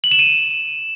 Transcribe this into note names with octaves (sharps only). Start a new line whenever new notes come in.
F#7
E7
D#7